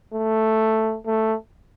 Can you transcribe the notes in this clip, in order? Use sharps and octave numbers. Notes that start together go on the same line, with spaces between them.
A3
A3